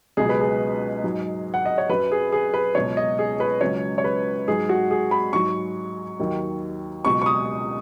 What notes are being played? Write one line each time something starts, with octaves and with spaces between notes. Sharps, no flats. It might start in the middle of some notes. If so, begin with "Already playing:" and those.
C#2 B2 F#3 G#4
B4
G#4
G#2 F#3
F#5
D#5
C#5
F#2 F#3 B4
G#4
G#4
B4
C#2 B2 F#3 C#5
D#5
G#4
B4
C#2 C#3 F#3 C#5
C#5
B4
G#2 F#3 G#4
F#4
G#4
B5
G#2 F#3 C#6
D#2 D#3 F#3
C#2 B2 F#3 C#6
C#6
D#6